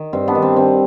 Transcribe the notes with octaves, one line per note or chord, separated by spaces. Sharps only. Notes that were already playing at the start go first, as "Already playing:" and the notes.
Already playing: D#3
G2 C4
B3 D4
D#3
C4
D#3 C4